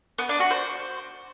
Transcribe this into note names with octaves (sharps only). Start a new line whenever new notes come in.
B3
D4
F#4
C5